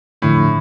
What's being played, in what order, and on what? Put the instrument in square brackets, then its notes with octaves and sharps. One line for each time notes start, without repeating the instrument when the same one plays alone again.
[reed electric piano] E2 D3 F3 [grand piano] A2